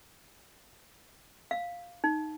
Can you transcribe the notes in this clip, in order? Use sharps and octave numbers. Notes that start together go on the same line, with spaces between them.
F5
D#4